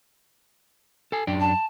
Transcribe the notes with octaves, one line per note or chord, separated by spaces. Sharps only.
A4 G#5
F#2 D4 G5
A5